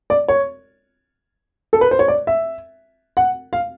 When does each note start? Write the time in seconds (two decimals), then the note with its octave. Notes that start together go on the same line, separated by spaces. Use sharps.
0.10 D5
0.28 C#5
1.73 A4
1.81 B4
1.91 C5
1.99 C#5
2.08 D5
2.27 E5
3.17 F#5
3.53 F5